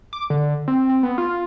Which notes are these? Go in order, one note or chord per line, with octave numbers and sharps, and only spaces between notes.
D6
D3
C4
C4
B3
F4